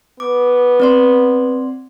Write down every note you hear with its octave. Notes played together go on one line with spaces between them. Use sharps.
B3 D6
C4 D5 C6